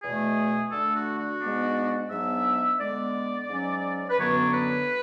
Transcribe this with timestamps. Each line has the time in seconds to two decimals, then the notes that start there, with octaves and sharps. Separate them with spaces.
0.02 E2 B2 A3 G#4
0.72 D3 A3 D4 A4
0.95 F#4
1.18 F#4
1.40 G#2 G#3 B3 D4
2.10 G#2 F#3 B3 D4 E5
2.80 D3 G#3 B3 D5
3.49 G#2 F#3 C#4
4.10 B4
4.18 F#2 D3 F#3 B3 D4 C#5
4.53 B4